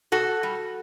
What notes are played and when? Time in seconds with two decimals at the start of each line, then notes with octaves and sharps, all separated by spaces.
0.12 B2 F#4 A4
0.43 G3